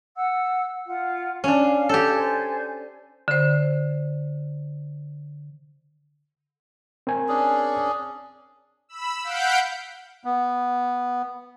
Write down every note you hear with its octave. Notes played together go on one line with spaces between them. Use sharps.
F#5 E6
F4 F#5
C#4 D4 F5
G4 A4 C#5 F5 G6
C5 D5 G#5
D3 C5
C4 A#4 G#5
C#4 D4 G#4
B5 E6
F5 F#5 G6 B6 D7
B3